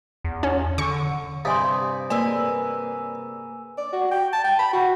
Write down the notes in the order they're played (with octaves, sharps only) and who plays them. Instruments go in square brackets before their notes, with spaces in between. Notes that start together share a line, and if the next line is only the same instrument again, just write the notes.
[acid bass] E2
[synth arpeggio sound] C#4
[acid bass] D3 [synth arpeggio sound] C#6
[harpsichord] G2 C3 [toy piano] F5 G#5 C6 [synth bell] D#6
[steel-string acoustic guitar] A#3 G#4 B4 [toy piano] D5 [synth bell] G#5 E6
[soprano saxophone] D5
F#4
G5
A5
G5
B5
F#4